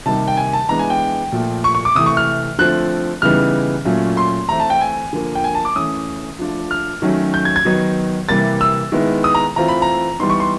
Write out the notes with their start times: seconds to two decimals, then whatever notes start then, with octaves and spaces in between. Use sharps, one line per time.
0.06 C3 D#3 G3 A#3 D#4 A5
0.28 G5
0.37 G#5
0.53 A5
0.69 E3 G#3 B3 D4 A#5
0.79 G#5
0.90 G5
1.32 A#2 F3 A3
1.64 C#6
1.75 C#6
1.85 D6
1.95 C3 E3 A3 D#6
2.06 C#6
2.17 F6
2.59 D3 F3 A3 C4 F#6
3.22 C#3 E3 G3 B3 D#4 F6
3.85 A#2 F#3 A3 C#4 F4
4.17 C6
4.49 E3 A3 C4 E4 A#5
4.60 A5
4.70 G5
4.81 G#5
5.13 D3 F3 A#3
5.35 G5
5.44 G#5
5.55 A5
5.65 D6
5.76 E3 A3 C#4 D#6
6.39 F3 A3 D4 F4
6.71 F6
7.02 D#3 F#3 A3 C#4
7.34 G6
7.45 G#6
7.56 G#6
7.65 D#3 F#3 B3 D#4
8.29 C3 E3 G3 A#3 A6
8.61 E6
8.92 D#3 G#3 B3 E4
9.24 D#6
9.34 A#5
9.56 E3 A3 C4 F4 A#5
9.68 B5
9.82 A#5
10.20 E3 G3 B3 D#4 C6
10.30 C#6
10.40 C6